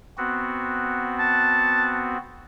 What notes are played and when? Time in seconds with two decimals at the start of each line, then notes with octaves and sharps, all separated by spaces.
0.18 B3 C4 F#4
1.19 A5